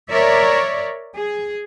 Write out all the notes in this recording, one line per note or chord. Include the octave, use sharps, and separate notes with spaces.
A#4 C#5 D5 E5
G#4